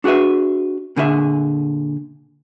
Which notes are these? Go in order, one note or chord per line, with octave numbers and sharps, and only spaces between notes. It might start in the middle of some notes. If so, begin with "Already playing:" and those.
D4 F#4 G#4 B4 E5
A#2 D3 G#4 B4 E5